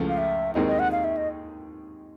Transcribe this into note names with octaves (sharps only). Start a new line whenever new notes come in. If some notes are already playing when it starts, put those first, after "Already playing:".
Already playing: C#2 C#3 F3 A3
F5
E5
D#2 D#3 G#3 C4 D#4 D#5
D#5
F#5
F5
E5
D#5